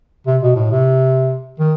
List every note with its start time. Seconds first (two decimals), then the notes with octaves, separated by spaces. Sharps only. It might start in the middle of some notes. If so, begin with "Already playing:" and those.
0.27 C3
0.42 B2
0.56 A2
0.71 C3
1.59 D#3